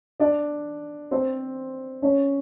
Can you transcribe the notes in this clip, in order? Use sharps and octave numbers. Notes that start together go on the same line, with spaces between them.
D4 D5
C4 C5
C#4 C#5